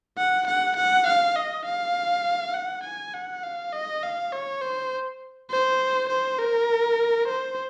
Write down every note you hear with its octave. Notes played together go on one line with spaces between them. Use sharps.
F#5
F#5
F#5
F5
D#5
F5
F#5
G#5
F#5
F5
D#5
F5
C#5
C5
C5
C5
A#4
C5